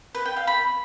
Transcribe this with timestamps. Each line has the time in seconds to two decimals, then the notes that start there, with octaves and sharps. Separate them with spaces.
0.15 B4
0.25 G5
0.36 F5
0.47 B5